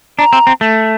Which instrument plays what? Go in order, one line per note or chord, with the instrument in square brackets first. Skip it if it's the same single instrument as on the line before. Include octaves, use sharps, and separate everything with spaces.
[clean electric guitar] D4 [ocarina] A#5
[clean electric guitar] C4
C4
A3